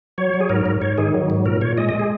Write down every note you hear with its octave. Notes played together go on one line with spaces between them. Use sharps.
F#3 C#5
F#3
G#4
G#2 A#4
G#2
G#2 C#5
D#3 G#4
F#3
G#2
A#2 A#4
A#2 C#5
G#3 D#5
D#5
G#3
G#4